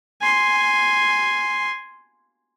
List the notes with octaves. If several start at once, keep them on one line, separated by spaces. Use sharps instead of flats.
G#5 C6